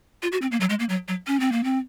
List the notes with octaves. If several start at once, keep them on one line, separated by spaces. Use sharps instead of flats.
F4
F#4
C4
A#3
F#3
G#3
A#3
F#3
F#3
C#4
C4
A#3
C4